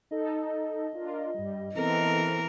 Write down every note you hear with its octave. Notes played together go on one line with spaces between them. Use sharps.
D#4 A4 D#5
D4 F4 A#4
G2 G3
E3 B3 C4 A4 A#4